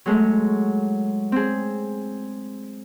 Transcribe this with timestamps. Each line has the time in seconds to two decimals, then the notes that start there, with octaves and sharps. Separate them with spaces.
0.06 F#3 G#3 A3
1.32 C4 G#4